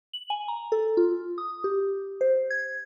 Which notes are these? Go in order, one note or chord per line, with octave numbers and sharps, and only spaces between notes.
F#7
G#5
A#5
A4
F4
D#6
G4
C5
G#6